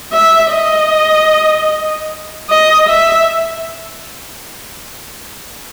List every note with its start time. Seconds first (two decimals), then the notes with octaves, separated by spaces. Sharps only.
0.13 E5
0.52 D#5
2.50 D#5
2.89 E5